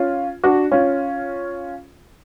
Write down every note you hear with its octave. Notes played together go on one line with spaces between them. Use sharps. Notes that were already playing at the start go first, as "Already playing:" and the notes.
Already playing: C#4 F4
D4 F#4
C#4 F4